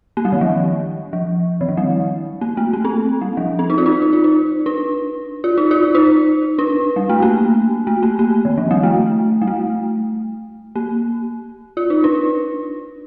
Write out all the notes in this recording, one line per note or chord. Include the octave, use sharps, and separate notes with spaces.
A#3
G3
D#3
F3
F3
D#3
F3
G3
A#3
A3
A#3
C4
G3
F3
C4
D#4
F4
D#4
D#4
F4
D#4
D4
F4
D#4
F4
D#4
D4
G3
A3
A#3
A3
A#3
A#3
D#3
F3
G3
A3
G3
A3
A#3
F4
D#4
D4